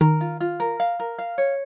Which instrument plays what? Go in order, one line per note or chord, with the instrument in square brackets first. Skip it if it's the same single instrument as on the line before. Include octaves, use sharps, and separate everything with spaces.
[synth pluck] D#3 [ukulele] A#4
[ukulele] F4
F4
A#4
F5
A#4
F5
C#5